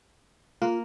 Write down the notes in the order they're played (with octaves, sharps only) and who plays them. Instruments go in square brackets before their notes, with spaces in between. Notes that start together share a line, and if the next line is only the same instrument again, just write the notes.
[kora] A#3 [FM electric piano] F4